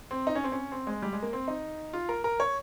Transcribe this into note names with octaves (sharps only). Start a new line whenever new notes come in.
C4
D#4
C#4
C4
C#4
C4
G#3
G3
G#3
A#3
C4
D#4
F4
A#4
A#4
C#5